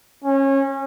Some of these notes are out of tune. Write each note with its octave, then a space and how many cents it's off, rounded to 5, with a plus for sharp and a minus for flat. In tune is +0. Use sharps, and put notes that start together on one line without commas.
C#4 -25